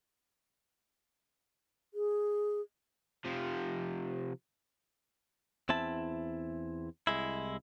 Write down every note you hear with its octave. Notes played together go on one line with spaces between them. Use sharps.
G#4
C3 F3
E2 C4 E4 A5
C2 G#3 E4